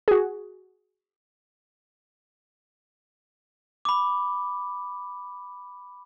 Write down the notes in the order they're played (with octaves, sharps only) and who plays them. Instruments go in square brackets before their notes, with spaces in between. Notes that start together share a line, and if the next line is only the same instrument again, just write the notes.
[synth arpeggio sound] F#4 G#4
[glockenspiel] B5 D6